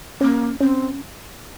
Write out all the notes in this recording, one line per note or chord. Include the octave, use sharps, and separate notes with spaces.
A#3 C#4
C4 C#4